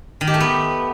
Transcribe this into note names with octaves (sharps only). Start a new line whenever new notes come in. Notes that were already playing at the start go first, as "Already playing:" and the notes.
D#3
G4
A3
B3